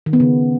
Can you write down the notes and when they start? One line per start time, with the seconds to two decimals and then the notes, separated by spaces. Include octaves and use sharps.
0.06 D#3
0.13 B3
0.20 C#3